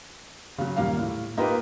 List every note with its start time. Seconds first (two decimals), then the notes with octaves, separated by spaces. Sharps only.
0.58 C#3 F#3
0.76 D#2 A#2 G3 A#3 F5
0.99 A2
1.37 A#3 D#4 F4 G4 A#4 B4